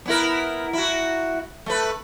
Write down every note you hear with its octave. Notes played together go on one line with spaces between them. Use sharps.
B3 E4 A#4
E4 F#4
A3 B4